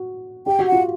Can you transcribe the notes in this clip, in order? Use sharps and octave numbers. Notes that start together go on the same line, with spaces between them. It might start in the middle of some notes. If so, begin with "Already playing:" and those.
Already playing: F#4
G4 G5
F#4
F#5
F4